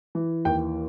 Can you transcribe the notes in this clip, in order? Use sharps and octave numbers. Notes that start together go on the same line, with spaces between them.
E3
D#2 G5